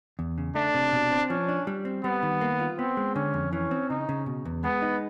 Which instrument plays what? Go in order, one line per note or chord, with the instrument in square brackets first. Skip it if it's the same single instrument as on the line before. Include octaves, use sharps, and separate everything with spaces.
[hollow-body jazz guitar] E2
C#3
[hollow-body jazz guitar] A3 [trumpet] D4
[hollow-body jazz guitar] C3
B2
C4
[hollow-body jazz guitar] F3 [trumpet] C#4
[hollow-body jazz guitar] D4
G3
C4
[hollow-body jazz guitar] G3 [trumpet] B3
[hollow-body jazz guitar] D#3
A#3
F4
[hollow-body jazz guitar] B3 [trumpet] C4
[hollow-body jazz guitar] G#3
[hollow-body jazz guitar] D3 [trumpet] C#4
[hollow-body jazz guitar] F2
[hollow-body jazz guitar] E3 [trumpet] C#4
[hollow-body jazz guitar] C4
[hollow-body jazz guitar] C#3 [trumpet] D#4
[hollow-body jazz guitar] C#3
B2
E2
[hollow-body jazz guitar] G#3 [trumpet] B3
[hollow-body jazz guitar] D#4